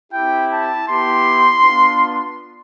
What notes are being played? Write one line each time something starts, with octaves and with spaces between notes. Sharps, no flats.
C4 E4 G4 G5
A5
B3 E4 G4 C6
B3 D4 F4